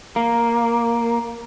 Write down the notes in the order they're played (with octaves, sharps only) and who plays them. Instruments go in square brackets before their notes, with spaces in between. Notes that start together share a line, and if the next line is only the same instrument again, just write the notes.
[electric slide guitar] A#3